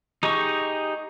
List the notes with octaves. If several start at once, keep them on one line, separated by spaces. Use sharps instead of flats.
D#4 G4 G#4 D#5 C#6